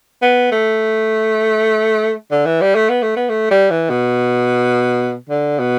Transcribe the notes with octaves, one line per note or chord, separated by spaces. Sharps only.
B3
A3
D3
E3
G3
A3
B3
A3
B3
A3
G3
E3
B2
D3
B2